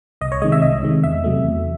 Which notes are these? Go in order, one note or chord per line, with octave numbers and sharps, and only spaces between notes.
C2 D#5
C#5
C3 D#3 G#3 D#5
E5
C2 D#5
C3 D#3 G#3
E2 E5
C3 F#3 A3
E2